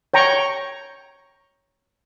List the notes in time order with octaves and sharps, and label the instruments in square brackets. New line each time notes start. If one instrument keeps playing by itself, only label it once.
[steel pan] C#5 G5 A#5 C#6